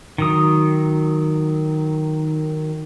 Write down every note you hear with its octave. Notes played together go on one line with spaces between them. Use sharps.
D#3 F#3 D#6